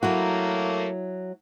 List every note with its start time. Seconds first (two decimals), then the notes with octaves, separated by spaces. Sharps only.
0.03 F#3 A3 A#3 E4 F#4 A#4